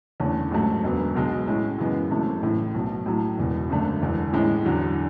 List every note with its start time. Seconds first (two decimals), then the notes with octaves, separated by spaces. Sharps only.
0.20 E2 D3 A3 C#4
0.51 A1 G#2 F#3 A3
0.84 E1 D2 D3 F#3 B3
1.15 B1 B2 G#3
1.47 A2 G#3 C#4 E4
1.79 F#2 C#3 E3 G#3 B3
2.11 G#1 F#2 C#3 E3 A3
2.42 A1 A2 E3
2.74 B1 B2 A3
3.06 A2 F#3 A3
3.38 E1 E2 B2
3.69 G#1 F#2 D3 A3 D4
4.01 E1 E2 D3
4.33 A1 A2 G#3 C#4 E4
4.65 E2 D3 F#3